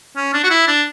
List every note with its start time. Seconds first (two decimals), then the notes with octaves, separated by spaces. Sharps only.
0.16 C#4
0.34 D4
0.44 F#4
0.50 E4
0.67 D4